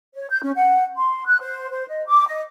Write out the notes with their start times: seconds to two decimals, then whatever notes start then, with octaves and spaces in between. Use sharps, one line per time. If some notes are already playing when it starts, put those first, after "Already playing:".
0.13 C#5
0.29 G6
0.43 C#4
0.55 F#5
0.96 C6
1.26 F#6
1.40 C5
1.71 C5
1.88 D#5
2.07 D6
2.27 D#5